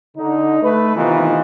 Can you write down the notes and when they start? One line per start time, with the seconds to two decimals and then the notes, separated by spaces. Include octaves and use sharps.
0.17 D3 D#4
0.63 A3 B4
0.96 C3 D#3 E3 B3 D#4 F4